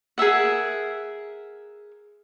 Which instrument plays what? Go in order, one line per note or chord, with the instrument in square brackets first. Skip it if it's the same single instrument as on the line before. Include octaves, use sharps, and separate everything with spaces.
[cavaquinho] G#4 A#4 E5 F#5